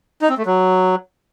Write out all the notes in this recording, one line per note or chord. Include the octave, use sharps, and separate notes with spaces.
D#4
C4
A3
F#3